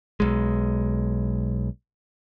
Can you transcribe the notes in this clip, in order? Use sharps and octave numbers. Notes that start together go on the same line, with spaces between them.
B1 G#3